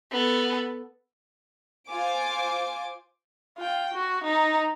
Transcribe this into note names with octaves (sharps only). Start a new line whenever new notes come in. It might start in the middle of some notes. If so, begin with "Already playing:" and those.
B3 A4
F4 C5 G#5 D6
F4 G5
F#4
D#4 A#5